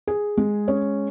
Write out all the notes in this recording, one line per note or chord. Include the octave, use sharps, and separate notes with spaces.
G#4
G#3
C#4